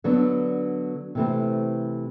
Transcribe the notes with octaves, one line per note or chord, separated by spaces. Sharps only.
D3 F#3 B3 D4
C3 E3 A3 C4